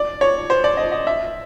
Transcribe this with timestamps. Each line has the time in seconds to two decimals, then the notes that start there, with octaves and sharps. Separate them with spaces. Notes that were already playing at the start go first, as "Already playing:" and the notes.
Already playing: D5
0.21 C#5
0.50 C5
0.64 D5
0.77 D#5
0.92 D#5
1.07 E5